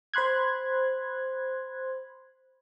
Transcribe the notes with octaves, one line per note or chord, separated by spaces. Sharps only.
C5 B5 C6 F#6 G#6